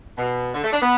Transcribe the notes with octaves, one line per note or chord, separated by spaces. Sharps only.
B2
D3
A3
D4
B3